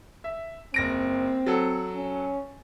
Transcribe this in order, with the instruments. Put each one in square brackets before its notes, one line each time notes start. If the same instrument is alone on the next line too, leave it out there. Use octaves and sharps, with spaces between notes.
[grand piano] E5
[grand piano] F#1 A#6 D7 [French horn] C4
[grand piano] F#3 A4 F#5
[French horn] C#4